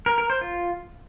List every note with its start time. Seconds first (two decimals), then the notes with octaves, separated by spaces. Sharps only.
0.06 A#4
0.18 A#4
0.30 C5
0.41 F4